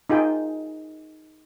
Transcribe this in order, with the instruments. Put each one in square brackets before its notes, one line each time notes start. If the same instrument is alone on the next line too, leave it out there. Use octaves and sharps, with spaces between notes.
[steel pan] D#4 F4 G#4 G5